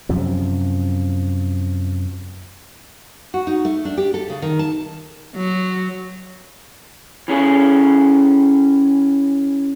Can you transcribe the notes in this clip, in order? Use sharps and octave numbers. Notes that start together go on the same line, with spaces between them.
F#2 C3 F3
F#4
D#4
A3
D4
G4
A4
C#3
D#3
A5
F#3
E3 C#4 G#4